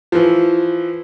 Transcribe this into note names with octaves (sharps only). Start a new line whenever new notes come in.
E3 F3